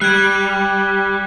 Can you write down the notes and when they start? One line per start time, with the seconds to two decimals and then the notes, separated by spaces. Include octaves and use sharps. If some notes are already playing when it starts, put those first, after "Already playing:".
0.01 G3 F#6 G#6